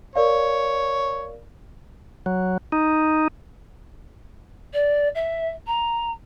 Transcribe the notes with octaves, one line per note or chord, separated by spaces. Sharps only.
A#4 C#5 D5 F5
F#3
D#4
D5
E5
A#5